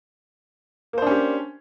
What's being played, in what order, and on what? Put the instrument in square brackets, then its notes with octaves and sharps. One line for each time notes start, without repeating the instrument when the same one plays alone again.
[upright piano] A#3
C5
D4
C#4
G4